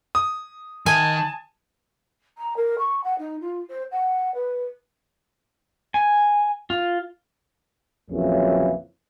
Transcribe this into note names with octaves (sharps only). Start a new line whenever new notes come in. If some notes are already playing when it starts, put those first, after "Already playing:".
D#6
D#3 G#5 A5
A#5
A#4
C#6
F#5
D#4
F4
C5
F#5
B4
G#5
F4
A#1 F2 C#3 E3 F#3 A#3